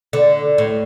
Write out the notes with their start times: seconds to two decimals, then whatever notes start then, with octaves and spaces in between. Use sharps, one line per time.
0.13 D3
0.58 A2